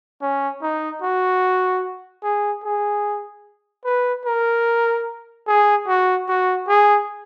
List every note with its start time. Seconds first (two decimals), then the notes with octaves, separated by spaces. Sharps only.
0.21 C#4
0.62 D#4
1.02 F#4
2.23 G#4
2.64 G#4
3.85 B4
4.25 A#4
5.47 G#4
5.88 F#4
6.28 F#4
6.68 G#4